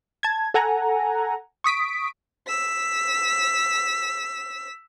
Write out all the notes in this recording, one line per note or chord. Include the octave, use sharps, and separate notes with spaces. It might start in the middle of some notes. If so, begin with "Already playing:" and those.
A5 G#6
A4 F#5 G#5 A#5
C#6 D#6 B6 D7
E6 B6